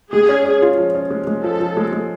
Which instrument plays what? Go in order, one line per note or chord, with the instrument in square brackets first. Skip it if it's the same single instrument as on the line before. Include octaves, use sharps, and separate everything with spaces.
[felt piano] G#3 [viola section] G#4
[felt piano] C#4
C#4
F4
F3
C#4
G#3
G#3
[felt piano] F3 [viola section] A4
[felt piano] F3
G#3
G#3